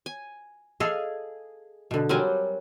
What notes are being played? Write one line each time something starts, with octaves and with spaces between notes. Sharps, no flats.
G#5
G#4 A4 D#5 F5
B2 D3
F#3 G3 C4 A#4 G#5